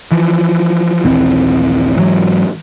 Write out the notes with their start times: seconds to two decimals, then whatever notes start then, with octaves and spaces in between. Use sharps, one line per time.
0.11 E3 F3
1.04 A#1 D#2 E3 C4
1.95 G#2 E3 F#3